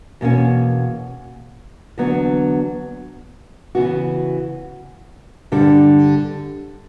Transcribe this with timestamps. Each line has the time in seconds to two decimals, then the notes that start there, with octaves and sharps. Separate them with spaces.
0.21 E2 B2 A#3 C#4
1.98 E2 D3 F#3 B3
3.75 C#3 E3 B3 F#4
5.52 G2 D3 G3